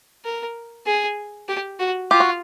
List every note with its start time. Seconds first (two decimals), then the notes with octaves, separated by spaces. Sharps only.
0.25 A#4
0.86 G#4
1.48 G4
1.79 F#4
2.11 F4 G4
2.20 F#4